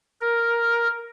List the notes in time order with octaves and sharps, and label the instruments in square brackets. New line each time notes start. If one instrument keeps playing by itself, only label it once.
[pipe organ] A#4